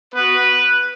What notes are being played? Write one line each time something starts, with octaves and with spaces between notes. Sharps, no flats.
B3 F#4 B4